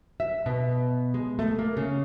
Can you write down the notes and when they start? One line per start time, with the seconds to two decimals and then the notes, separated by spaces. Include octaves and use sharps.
0.20 E5
0.46 B2
1.14 G#3
1.39 A3
1.59 A#3
1.77 C#3